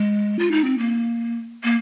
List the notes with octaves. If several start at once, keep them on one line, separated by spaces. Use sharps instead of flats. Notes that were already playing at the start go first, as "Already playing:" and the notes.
Already playing: G#3
F4
D#4
C4
A#3
A#3